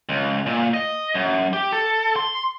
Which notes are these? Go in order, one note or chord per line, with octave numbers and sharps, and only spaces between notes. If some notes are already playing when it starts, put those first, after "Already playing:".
C#2
A#2
D#5
F#2
G4
A4
C6